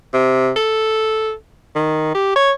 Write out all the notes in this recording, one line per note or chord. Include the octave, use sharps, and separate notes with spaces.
C3
A4
D#3
G4
C#5